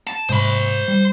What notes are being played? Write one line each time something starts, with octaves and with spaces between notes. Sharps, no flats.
A5
G#2 C3 G#3 C5 B5
G3